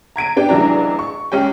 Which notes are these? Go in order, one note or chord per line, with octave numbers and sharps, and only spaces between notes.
A#5 G#6 D7 D#7
B3 D4 G4 G5
F1 C#2 E3 F#3 D4 A#5
C#6
C#2 C#4 G4 G5